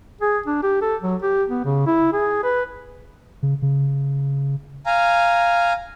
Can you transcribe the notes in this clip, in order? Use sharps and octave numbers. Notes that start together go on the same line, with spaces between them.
G#4
D4
G4
A4
F#3
G4
B3
C#3
E4
G#4
B4
C#3
C#3
F5 G#5 A#5